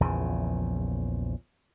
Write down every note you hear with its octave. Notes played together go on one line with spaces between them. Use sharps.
A#1 E2 C#3 F3